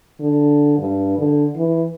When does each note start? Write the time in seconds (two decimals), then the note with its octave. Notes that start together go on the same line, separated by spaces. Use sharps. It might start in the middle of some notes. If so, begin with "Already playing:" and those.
0.21 D3
0.78 G2
1.18 D3
1.56 E3